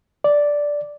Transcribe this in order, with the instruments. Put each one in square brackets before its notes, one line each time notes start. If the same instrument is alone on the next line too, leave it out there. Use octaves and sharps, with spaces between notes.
[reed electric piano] D5